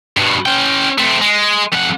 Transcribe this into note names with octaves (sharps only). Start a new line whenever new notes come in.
G2 B2
C#4 G5
A3 C4
G#3
F2 F#5